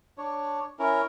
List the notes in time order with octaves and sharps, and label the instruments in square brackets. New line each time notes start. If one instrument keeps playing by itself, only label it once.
[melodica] D4 C#5
C#4 E4 A#4